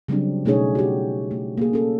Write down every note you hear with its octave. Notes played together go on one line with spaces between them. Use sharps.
C#3 F#3 G3 C4 D4
B2 A3 C#4 D#4 G#4 C#5
F#4 G4
A3
A#3 G#4
C#4 A4